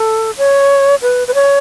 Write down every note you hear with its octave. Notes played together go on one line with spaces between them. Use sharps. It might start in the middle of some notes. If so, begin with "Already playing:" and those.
Already playing: A4
C#5
B4
B4
C#5